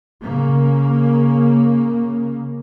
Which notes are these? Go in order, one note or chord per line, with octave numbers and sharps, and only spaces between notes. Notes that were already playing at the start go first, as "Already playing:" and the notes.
C#3 A#3